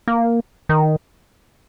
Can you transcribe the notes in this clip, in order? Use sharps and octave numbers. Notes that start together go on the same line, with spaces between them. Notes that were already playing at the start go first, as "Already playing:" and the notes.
A#3
D#3